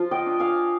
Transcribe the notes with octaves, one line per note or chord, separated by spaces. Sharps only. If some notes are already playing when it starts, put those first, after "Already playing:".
Already playing: F3 F4
D#5 G5
D4
F5 G#5